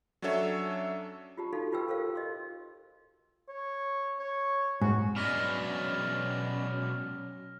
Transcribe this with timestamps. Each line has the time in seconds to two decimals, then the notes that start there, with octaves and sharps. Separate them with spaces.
0.22 F#3 C#4 D4 A4 C#5 E5
1.37 F4 G4 A5
1.53 D#4 F#4 A4 F5
1.72 F4 G4 B4 G5 E6
1.88 A4 A#4 C5 F5
2.16 D#5 C6
3.48 C#5
4.19 C#5
4.81 G#2 F#4
5.16 B2 F#3 G#3 C#4 D5 F6 A#6